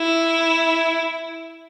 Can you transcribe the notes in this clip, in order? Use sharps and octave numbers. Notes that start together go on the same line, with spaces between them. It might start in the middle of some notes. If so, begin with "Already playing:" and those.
Already playing: E4